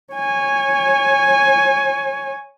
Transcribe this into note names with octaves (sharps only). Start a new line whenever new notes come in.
C#5 G#5